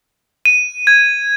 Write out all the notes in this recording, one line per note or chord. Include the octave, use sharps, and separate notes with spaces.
D#7
G#6